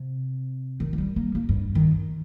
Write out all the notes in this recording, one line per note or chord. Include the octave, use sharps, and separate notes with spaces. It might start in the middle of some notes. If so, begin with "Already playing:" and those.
Already playing: C3
D#3
A#3
G3
A#3
A#3
G2
D#3